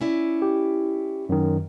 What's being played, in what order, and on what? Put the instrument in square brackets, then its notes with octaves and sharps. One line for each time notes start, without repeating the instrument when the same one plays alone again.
[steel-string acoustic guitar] C#4 E4 D5
[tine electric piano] G4
F#2 D#3